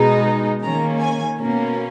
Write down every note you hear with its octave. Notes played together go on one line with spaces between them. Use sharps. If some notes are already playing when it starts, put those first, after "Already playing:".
Already playing: B2 G#3 D#4
D#3 A#3 C#4 A#5
G#5
B2 A#3 C#4